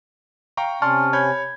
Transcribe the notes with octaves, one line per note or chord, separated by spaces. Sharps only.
F5 G5 A#5 C#6
C3 C#4 D5 A5 C6 C#6 F6
C#5 B5 G6 G#6